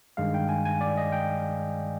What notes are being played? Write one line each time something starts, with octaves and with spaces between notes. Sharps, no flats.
G2 D#3 G#3 F5
G5
G#5
G#5
D5
D#5
G5